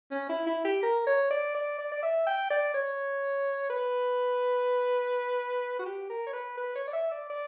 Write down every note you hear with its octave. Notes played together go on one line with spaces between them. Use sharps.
C#4
E4
E4
G4
A#4
C#5
D5
D5
D5
D5
E5
G5
D5
C#5
B4
F#4
G4
A#4
C#5
B4
B4
C#5
D5
E5
D5
D5